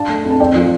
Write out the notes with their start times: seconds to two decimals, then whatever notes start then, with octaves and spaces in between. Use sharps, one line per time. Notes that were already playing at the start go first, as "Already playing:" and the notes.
Already playing: D4 F5 A5
0.09 A3
0.24 F2
0.30 A5
0.40 C4 D5 G5
0.55 F3